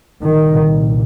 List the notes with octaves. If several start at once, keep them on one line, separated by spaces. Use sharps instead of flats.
C2 A#2 D#3